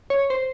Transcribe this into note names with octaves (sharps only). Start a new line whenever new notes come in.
C#5
C5